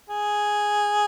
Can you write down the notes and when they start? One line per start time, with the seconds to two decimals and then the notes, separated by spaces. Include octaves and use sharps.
0.09 G#4